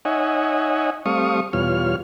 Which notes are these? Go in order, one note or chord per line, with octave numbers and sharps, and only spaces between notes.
D#4 C#5 D#5 E5 F#5 G#5
G3 A3 C4 F5 C#6 D#6
E2 B2 G3 F4 C#5 F6